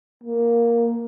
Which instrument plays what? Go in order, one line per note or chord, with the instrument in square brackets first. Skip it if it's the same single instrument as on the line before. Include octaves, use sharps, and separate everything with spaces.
[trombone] A#3